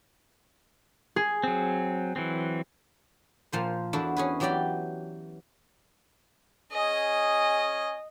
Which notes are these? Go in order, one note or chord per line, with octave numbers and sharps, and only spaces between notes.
G#4
F#3 C4
E3 F#3 C4
A#2 F3 C5
E2 D4 E4 F#4 A4
C#4 G#4 B4
E3 F#3 G4 D5 G5 B5
C#4 G#4 D#5